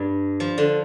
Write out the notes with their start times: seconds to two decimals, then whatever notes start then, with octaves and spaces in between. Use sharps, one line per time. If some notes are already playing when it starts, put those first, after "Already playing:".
Already playing: G2
0.40 F3
0.58 D3